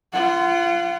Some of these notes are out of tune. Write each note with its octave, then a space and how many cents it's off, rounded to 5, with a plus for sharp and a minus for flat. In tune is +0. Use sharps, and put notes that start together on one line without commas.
F4 -25 F#5 +15